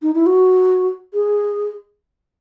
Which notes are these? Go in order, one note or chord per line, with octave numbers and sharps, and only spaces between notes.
D#4
E4
F#4
G#4